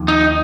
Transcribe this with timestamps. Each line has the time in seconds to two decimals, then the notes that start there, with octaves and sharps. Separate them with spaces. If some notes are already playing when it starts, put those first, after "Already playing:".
Already playing: D#2 F3
0.08 D#4